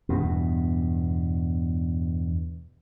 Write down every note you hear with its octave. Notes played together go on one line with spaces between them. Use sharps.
E2 G2 B2